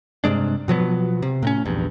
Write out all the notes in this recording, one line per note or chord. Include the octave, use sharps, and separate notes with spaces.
G2 C3 G#3 D4
B2 F3 F#3 B3
C3
A2 C4 C#4
A#1 E2 G2